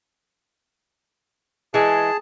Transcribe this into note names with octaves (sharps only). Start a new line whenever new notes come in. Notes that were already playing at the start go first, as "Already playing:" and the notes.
E3 G#3 G#4 A5